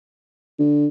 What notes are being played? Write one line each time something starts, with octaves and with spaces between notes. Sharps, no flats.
D3